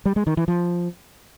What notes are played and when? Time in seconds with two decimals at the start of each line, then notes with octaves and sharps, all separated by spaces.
0.06 G3
0.16 G#3
0.27 D#3
0.37 E3
0.48 F3